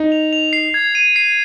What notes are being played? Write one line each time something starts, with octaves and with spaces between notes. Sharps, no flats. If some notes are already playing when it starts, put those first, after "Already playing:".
Already playing: D#4
F7
F7
C7
G#6
D#7
C7